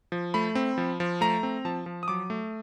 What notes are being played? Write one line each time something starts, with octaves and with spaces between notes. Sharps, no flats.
F3
A3 B5
C4
F3
F3
A3 A#5
C4
F3 A5
F3
D#6
F#3 D6
A3